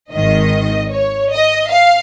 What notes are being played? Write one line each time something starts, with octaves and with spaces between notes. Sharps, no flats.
G#1 G#2 D#3 D#5
C#5
D#5
F5